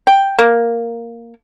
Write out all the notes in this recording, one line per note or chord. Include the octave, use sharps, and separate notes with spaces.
G5
A#3